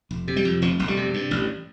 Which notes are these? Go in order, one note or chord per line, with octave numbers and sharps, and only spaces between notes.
F1
C3
G3
F2
F1 F3
F1
G3
C3
G2
A1